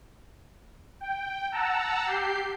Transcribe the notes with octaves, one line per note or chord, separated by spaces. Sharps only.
G5
F#5 A5 A#5 E6
G4 G6 C7